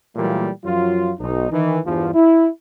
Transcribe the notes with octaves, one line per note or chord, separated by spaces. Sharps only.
A#2 E3 F#3 G3 A3 A#3
F#2 F3 F#3 F4
B1 D#4
D#3 E3
E2 G2 F3
E4